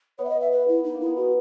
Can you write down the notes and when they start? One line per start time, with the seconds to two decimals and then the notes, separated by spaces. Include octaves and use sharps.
0.18 B3 C#5
0.24 E5
0.29 D#5
0.40 E5
0.52 B4
0.68 E4
0.84 B3 D#4
0.95 A#3
1.01 E4
1.06 B3
1.16 G#3 F#4